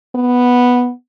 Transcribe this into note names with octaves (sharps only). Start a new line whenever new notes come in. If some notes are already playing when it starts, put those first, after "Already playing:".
B3